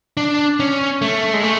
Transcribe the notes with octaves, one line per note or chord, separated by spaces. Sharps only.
D4
C#4
A3
G#3
A3